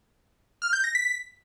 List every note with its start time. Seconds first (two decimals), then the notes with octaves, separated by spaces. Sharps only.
0.62 F6
0.73 G6
0.84 A#6
0.95 B6